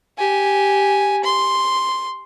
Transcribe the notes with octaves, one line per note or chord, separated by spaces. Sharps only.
G4 G#5
C6